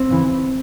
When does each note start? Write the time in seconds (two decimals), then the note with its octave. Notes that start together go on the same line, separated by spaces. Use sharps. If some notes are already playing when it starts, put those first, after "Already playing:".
Already playing: C4
0.09 E2 C#3 E3